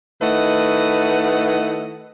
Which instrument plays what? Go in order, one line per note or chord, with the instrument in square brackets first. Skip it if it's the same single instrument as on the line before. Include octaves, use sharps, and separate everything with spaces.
[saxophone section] D#3 A3 E4 B4 D#5 F#5